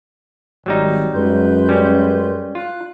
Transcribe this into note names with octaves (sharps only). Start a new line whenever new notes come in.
G#1 F#3 G3 D#4
F#2 G#3 B4 C6 G6
G3 C#4
F4 F#6